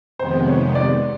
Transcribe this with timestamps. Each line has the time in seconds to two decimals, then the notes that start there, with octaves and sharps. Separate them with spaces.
0.19 F2 C3 D#3 G#3 B3 C5
0.47 C#5
0.75 D5